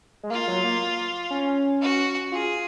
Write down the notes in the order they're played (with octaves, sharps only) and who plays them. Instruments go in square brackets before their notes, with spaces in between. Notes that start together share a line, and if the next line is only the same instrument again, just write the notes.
[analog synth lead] G#3
[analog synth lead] A#3 [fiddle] F4
[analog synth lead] F#3
A#3
C#4
[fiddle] F#4
[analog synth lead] F4 [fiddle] G#4